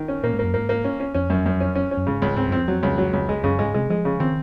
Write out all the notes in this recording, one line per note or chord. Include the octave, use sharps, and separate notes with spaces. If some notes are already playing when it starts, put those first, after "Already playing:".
Already playing: D#3
C#4
A#2 A#3
G#2
F#2 A#3
G#2 A#3
A#3
C#4
C#4
F2 C#4
F#2
F#2
C#4
C#4
C#4
F#2
G#2 C#3
C#2
G#2 C4
F#2
F2 C4
F#3
C#2
F#3
C#2
G#3
F#2 C#3
G#2 G#3
C3 G#3
F3 G#3
C#3
D#3 C4